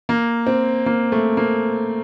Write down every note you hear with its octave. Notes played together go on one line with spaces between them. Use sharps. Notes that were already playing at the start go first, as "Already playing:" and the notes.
A#3
C4
A#3
A3
A#3